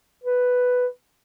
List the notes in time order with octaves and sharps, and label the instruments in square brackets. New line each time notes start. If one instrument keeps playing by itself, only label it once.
[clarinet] B4